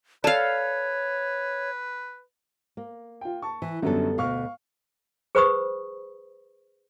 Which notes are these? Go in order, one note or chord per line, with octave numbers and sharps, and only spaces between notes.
A4 B4 C#5 D5 F5 A5
A#3
F4 G5
A5 C#6
E3
F#2 D3 F#3 G3 B3 A4
D2 B2 F5 C#6 F6
G#4 B4 C5 B5 C#6 D#6